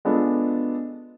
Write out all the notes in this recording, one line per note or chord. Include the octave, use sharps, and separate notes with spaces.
G#3 B3 D4 F4 A4